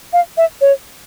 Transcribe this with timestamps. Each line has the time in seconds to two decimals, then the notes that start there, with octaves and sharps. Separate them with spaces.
0.13 F5
0.37 E5
0.61 C#5